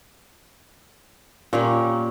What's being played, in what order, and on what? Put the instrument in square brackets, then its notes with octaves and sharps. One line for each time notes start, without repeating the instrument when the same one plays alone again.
[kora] A#2 [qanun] G3 A#3 C#4